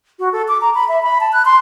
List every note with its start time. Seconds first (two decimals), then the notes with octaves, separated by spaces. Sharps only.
0.19 F#4
0.32 A4
0.48 D6
0.61 A#5
0.75 B5
0.88 E5
1.03 B5
1.20 A5
1.32 F#6
1.45 C6